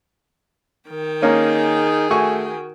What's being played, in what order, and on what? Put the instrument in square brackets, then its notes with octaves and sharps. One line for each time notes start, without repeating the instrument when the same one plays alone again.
[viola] D#3 G5
[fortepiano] A#3 C#4 [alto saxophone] D#4 [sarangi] G#4
[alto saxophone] A3 [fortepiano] F#4 G#5 C#6